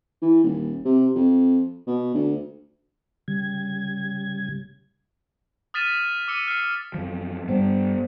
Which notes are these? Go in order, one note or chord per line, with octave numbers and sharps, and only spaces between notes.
E3
D#1
C3
F2
B2
D2
C#3 G3 G#6
D#6 F6 A6 B6 D#7 E7
D6 E6 C#7 D#7
F6 C7
F#2 F3
G2 G3 B3 C5